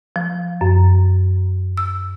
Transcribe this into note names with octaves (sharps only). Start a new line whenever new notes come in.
F3
F#2
E6